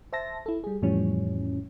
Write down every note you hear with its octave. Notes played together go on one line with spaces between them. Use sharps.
C5 E5 A5 A#6
E4 A4
G3 G#4
F2 A2 E3 F3 G3 C#4